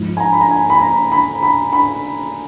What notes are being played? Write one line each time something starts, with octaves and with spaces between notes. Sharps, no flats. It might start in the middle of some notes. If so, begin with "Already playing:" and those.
Already playing: G#2 F3 G#3
G#5
A#5
B5
A#5
G#5
B5
A#5
B5
B5
B5